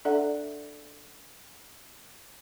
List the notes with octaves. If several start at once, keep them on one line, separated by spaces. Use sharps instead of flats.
D4 A4 D5 E5 F#5